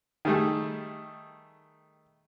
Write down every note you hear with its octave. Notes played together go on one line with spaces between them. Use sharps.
D#3 G3 A3 G#4